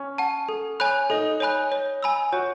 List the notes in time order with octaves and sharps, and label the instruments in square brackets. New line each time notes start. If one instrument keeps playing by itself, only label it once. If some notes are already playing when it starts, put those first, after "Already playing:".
Already playing: [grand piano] C#4
[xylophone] F#5 A5
A4
C#5 G#5 B5 F#6
[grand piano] D#4 [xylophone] A4
[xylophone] C#5 G#5 B5 F#6
C#5
G#5 B5 E6
[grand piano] F#4 [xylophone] C#5